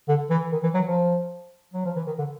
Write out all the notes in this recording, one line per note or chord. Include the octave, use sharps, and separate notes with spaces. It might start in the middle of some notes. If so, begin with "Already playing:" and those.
D3
E3
D#3
E3
F#3
F3
F#3
F3
E3
D#3
D3